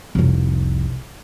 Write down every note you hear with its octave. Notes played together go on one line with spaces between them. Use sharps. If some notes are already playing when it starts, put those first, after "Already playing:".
F1 C2